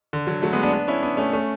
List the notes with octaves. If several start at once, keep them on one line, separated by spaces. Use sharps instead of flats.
D3
D3 F#3
F#3 A3
G#3 B3
B3 D4
B3 D4
C#4 E4
B3 D4
A3 C#4
A3 C#4